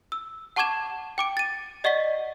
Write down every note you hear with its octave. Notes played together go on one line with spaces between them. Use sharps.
E6
F#5 A5 C#6 D6 G#6 E7
G5 D6 D7
A6 D#7
D5 D#5 F#5 C#6 A6 B6